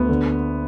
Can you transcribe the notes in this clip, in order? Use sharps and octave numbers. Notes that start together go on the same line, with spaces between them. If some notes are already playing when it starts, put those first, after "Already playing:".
Already playing: D2 B3
D3